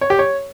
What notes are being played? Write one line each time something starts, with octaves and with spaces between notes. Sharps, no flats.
C#5
G4
C#5